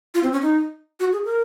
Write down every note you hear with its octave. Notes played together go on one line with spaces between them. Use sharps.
F4
C4
C#4
D#4
F#4
G#4
A#4